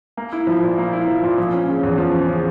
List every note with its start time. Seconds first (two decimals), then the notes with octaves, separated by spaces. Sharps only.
0.17 A#3
0.33 E4
0.47 F3
0.63 A#2
0.78 A#3
0.93 E4
1.08 F3
1.24 A#2
1.38 F3
1.53 C#4
1.68 C#3
1.83 E2
1.98 F3
2.14 C#4
2.29 C#3